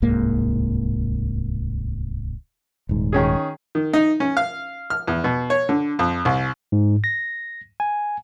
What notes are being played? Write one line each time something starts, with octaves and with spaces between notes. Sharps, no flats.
D1 C2 G#2 A#3
D#1 G#2
D#3 C#4 G#4
D#3
D#4
C#4
F5
F6
E2
B2
C#5
D3
F2
C2
G#2
A#6
G#5